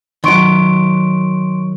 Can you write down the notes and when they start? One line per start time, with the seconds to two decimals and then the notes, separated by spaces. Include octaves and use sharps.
0.24 D#3 F#3 C6 C#6 D7